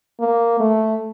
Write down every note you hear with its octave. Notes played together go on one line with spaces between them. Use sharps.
A#3
A3